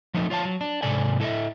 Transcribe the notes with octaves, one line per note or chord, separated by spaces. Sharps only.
F3 F#3 A3 D#4
F4 C#5 F5 A5
F#3
D4
G#2 C3 A4 D5 G#5
E4 A4 D#5 E5